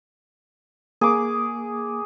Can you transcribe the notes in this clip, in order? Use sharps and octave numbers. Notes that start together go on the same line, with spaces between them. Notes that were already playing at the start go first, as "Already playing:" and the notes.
A#3 G#4 D6